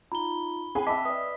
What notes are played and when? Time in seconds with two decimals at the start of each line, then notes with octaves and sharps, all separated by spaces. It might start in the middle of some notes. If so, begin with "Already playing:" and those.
0.12 D#4 F4 A#5 B5 G7
0.75 C4 G#4 G5 G#5 B5
0.87 D#5 E5 A5 D6 B6
1.05 B4 D5 D#6